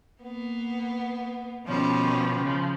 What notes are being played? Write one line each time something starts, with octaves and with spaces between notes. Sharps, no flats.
A#3 B3
B2 D#3 F3 G3 C#4
C#3 F3